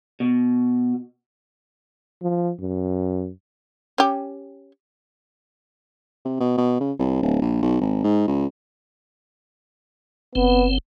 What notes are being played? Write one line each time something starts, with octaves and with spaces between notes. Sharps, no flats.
B2
F3
F#2
C#4 G4
C3
B2
B2
C#3
C2
D1
A#1
B1
G#1
G#2
C#2
F#1 B3 C4